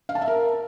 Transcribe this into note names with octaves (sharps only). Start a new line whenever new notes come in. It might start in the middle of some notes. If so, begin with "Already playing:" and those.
F5
A5
E5
A#4